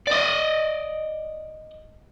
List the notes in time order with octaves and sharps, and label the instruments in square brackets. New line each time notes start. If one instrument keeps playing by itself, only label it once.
[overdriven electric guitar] D5 D#5